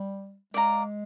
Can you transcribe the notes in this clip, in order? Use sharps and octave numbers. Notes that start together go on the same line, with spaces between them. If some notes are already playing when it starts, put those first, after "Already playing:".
Already playing: G3
G#3 D5 F5 A#5